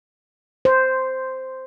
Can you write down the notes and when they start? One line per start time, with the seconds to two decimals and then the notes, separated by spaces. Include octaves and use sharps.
0.65 C5